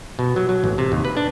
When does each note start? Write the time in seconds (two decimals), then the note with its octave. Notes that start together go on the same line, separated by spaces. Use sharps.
0.19 B2
0.36 F#3
0.49 F#3
0.64 A1
0.78 C3
0.92 D#2
1.05 B4
1.17 D4